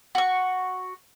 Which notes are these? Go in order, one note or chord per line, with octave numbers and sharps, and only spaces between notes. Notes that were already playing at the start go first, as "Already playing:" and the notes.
F#4 C#6